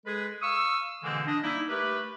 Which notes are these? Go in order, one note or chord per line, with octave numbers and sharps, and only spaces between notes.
G#3 G#4 A4 B4
F5 C#6 D#6 E6
B2 D3 E3 G#3 A#3 C4
D4 D#5
G3 A#3 D#4 E4
A3 G4 A#4 B4